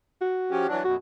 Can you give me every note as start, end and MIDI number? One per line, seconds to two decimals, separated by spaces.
0.21 0.73 66
0.51 0.67 53
0.51 0.67 61
0.51 0.67 67
0.68 0.83 52
0.68 0.83 54
0.68 0.83 62
0.85 0.97 42
0.85 0.97 47
0.85 0.95 66